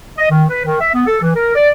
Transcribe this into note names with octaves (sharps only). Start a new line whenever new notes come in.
D#5
D#3
B4
D#3
E5
B3
A4
E3
A#4
D5